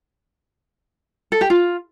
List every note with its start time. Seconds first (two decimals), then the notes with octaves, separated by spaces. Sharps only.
1.32 A4
1.41 G4
1.50 F4